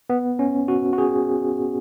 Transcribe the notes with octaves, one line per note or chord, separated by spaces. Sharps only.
B3
C#4
F#4
F#4
G#4